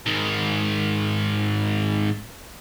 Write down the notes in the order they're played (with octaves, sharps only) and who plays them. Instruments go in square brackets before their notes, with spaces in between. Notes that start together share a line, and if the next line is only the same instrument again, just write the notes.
[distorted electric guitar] G#2 D#3